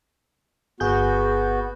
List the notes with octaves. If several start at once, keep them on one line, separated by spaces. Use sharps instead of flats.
G1 B3 F#4 G#4 G6